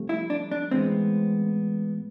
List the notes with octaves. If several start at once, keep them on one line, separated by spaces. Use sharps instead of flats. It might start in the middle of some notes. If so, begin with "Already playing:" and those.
Already playing: C2 C3 F3 A3
E4
D4
D4
A2 E3 G#3 B3 C4